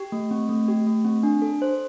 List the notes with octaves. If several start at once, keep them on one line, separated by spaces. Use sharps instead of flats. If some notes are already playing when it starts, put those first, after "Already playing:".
Already playing: G4
A3
C4
A3
G4
A3
C4
D4
A4
C5